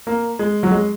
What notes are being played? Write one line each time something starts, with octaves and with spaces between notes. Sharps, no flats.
A#3
G#3
F#3
G#3